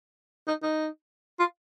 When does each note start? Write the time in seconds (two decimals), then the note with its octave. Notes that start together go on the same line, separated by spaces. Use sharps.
0.48 D#4
0.63 D#4
1.39 F4